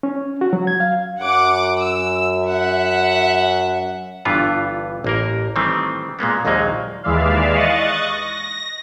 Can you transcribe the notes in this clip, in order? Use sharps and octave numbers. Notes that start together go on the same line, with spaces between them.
C#4
F#4
F#3
G#6
F5
F#2 F#5 D6
E6
E5 F#5
G1 G2 D3 E3 B3 F4
A1 A#3 A#4
D#3 E3 G3 A3 C4
A#2 G#3 A#3 B3
A#1 D#2 F#3 G#3 A#3 D#4
D#2 E3 G#3 D5 E5 F5
D#5 C#6 D#6 F#6 A6
A#6